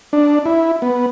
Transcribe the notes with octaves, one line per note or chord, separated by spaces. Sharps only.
D4
E4
B3